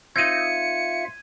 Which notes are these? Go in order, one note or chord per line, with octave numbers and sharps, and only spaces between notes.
C4 D#4 F4 E5 F5 G#6 C#7 D#7